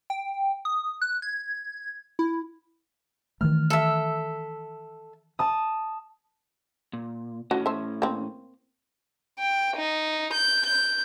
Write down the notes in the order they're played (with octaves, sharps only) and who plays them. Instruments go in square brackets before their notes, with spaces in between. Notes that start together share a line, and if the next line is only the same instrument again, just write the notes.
[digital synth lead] G5
D#6
F#6
G#6
E4
[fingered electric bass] D#3 E3 A3 [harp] F6
[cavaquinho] A4 E5
[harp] A5 D#6
[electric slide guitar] A#2
[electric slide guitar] A2 C#4 [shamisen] F#4
[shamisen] C5 E5
A#3 C4
[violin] G5
D#4
G6
G6